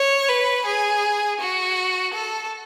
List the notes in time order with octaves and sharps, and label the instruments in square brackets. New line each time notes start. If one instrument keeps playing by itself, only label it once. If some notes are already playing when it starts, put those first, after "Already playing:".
Already playing: [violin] C#5
B4
G#4
F#4
A4